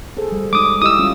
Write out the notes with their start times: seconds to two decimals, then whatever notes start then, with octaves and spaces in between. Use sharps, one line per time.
0.17 G#4 A4 C5
0.32 G3
0.53 G#3 D#4 D6 D#6
0.82 E4 G4 D#5 D#6 E6
0.99 G3 C#4 F4